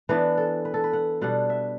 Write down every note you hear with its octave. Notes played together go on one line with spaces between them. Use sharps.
E3 B3 D4 B4
A4
B4
A4
B4
F#5
B2 G3 D4 F#5
E5